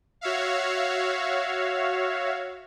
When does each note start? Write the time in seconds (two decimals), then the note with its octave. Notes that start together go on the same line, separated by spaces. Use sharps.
0.21 F#4 C#5 E5 F5